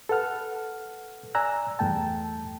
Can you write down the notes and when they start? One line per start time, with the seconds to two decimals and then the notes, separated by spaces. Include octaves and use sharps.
0.09 A4 B4 F#5 F6
1.35 D5 G#5 A#5 E6 F#6
1.79 E2 G2 A3 G5 A5